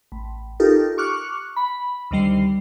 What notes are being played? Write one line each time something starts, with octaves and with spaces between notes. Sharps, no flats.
A1
D#4 F4 G4 A4 A#4
C#6 D6 F6 F#6 C#7
B5
D2 C3 D#3 G3 C7